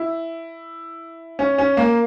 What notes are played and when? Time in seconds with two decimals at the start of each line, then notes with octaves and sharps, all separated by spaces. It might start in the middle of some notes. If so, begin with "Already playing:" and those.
Already playing: E4
1.39 C#4
1.58 C#4
1.77 A#3